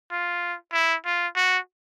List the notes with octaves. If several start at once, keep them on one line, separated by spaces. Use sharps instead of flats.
F4
E4
F4
F#4